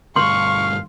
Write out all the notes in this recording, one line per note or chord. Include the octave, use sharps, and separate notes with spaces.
D2 G2 F5 C6 C#6